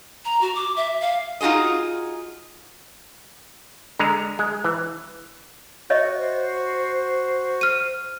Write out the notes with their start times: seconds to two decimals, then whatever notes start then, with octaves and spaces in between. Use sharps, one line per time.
0.25 A#5
0.41 F#4
0.55 D6
0.76 E5
1.01 F5
1.41 D#4 F4 F#4 G#4 D#5
3.99 D3 G#3 A#5
4.39 G#3
4.64 E3
5.90 F#4 C#5 D#5 E5
6.18 C5
7.61 F6 D#7